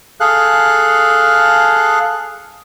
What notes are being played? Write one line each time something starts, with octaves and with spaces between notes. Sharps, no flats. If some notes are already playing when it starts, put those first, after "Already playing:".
G#4 A4 F5 F#6